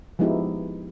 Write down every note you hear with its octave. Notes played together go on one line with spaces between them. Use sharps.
F3 G#3 B3 D#4 E4 G4